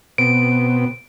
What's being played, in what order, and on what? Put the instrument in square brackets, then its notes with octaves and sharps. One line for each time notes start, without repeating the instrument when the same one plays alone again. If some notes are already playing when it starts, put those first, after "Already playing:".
[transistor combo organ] B2 B3 C4 [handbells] D7